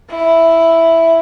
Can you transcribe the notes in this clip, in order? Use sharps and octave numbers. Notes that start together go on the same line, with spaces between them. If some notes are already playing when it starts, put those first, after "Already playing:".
E4